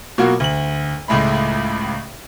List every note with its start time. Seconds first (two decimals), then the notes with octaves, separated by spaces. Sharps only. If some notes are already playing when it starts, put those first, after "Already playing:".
0.18 B2 F#3 A#3 F4 F#4
0.40 D2 F#7
1.08 C#2 A2 G#3 A3 B5